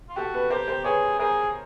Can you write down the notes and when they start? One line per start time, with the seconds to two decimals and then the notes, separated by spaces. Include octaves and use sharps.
0.09 F4
0.16 F#4 G4 A4
0.33 A4 B4
0.50 G4 A#4 C5
0.67 A#4 C5
0.84 G#4 B4 C#5
1.19 G#4 A#4 C5